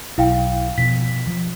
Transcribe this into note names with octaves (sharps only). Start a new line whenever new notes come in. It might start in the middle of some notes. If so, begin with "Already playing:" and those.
B1 E4 F5 G5
B2 F3 B6
F3